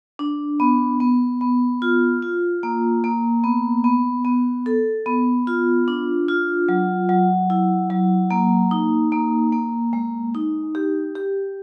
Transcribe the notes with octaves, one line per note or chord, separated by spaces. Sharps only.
D4
B3
B3
B3
F4
F4
A#3
A#3
B3
B3
B3
A4
B3
F4
D4
F4
F#3
F#3
E4
F#3
A#3
D#4
A#3
A#3
G#3
D#4
G4
G4